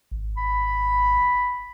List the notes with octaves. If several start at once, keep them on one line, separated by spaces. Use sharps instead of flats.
G#1
B5